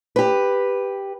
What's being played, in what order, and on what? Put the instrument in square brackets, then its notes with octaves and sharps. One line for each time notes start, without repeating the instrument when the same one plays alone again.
[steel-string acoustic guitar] G4 B4